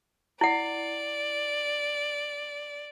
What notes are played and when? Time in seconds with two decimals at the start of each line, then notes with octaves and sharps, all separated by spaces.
0.41 E4 D5 F#5